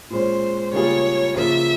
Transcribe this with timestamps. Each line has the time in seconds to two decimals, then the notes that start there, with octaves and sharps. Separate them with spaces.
0.10 A#2 G#3 C#4 C5
0.73 C#3 G3 A#3 F4 G#4 C#5
1.36 C#3 F3 A#3 F4 E5